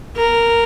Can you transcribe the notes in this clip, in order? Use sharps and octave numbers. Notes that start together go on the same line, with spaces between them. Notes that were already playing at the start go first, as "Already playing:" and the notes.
A#4